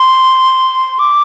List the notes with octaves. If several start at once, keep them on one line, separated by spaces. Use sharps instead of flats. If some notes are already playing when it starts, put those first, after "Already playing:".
Already playing: C6
D6